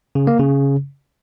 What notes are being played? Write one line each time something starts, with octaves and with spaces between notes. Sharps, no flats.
C#3
A#3
C#3